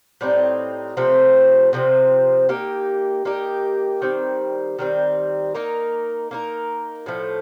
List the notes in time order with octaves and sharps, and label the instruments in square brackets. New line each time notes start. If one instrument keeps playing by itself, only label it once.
[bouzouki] A2 G3 C4 D#4
C3 F3 A3 C4
C3 F3 A3 C4
A#3 D#4 G4
A#3 D#4 G4
D#3 G3 C4
D#3 G3 C4
A#3 D#4 A#4
A#3 D#4 A#4
A2 F3 A3